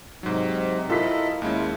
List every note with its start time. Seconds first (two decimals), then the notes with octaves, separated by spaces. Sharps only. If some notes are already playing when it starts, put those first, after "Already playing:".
0.23 G#2 C3 F#3 D#4
0.90 E4 F4 A4 A#4 D#5 B6
1.42 D#2 G#3 C#4 E4